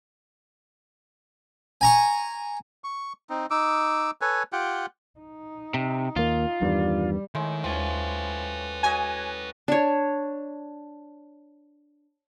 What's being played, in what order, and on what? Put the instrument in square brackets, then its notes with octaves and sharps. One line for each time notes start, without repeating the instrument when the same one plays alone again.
[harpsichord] G#5 A#5 C#6
[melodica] C#6
C4 D#4
D#4 D6 E6
A4 B4 C#5 G#5
F4 G4 F#5 G5
[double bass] D#4
[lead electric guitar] C3
[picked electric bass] D#2 A#3 [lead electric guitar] F4
[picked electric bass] E2 G2 D#3 [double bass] G3
[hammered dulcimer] A2 G#3 [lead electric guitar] D#3
[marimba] D#2 [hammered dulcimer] F3 C#4 [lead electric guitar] B4 G5
[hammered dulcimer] F#4 C#5 D#5 [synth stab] G#5
[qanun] D4 C#5